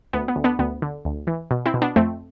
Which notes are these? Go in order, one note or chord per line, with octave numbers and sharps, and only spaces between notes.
D2 B3
B3
D2
B3 D4
D2 B3
D3
D2
E3
B2
C4 E4
B2
B3 D4
F2 A3 C4